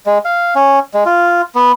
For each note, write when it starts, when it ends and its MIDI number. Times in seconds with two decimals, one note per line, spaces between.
0.06 0.18 56
0.25 0.54 77
0.55 0.79 61
0.94 1.04 56
1.06 1.42 65
1.55 1.72 59